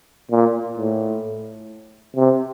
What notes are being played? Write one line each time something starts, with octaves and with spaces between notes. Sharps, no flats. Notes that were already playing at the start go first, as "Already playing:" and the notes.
A#2
A2
C3